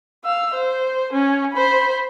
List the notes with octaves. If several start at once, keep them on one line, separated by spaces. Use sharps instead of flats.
F5 E6
C5
C#4
C5 B5